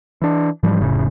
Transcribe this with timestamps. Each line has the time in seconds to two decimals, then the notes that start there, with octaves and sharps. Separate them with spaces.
0.22 E3 D4
0.63 G#2 E3 F3 G3
0.80 F1 A2 C#3